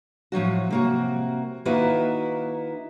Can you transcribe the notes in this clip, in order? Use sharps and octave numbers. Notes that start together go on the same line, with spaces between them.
A2 F3 F#3 F#4
C3 A#3 F#4
D#3 A#3 D#4 E4 F#4 B4